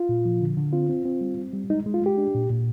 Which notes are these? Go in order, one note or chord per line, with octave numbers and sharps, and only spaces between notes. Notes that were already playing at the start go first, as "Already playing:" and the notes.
Already playing: F4
A#2
F3
D3
D3
C4 F4
C4
C4
G3
C4
G3
G#3 D#4
G#3
F4
G#3 G4
D4
A#2
A#2